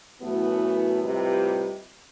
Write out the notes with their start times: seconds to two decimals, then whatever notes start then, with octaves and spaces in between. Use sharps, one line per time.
0.22 F#2 A2 E3 A3 B3 F#4
1.03 A2 C3 G3 F4 B4 D#5